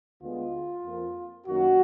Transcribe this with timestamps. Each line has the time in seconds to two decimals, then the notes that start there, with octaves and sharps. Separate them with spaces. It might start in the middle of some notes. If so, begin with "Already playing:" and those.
0.22 D2 D3 G#3 B3 F4
0.84 F2 F3 A#3
1.47 F#2 D#3 F#3 A#3 F#4